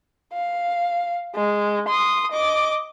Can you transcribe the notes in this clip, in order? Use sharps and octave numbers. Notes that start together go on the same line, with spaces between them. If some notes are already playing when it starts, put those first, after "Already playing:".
F5
G#3
C6 D#6
D#5 D6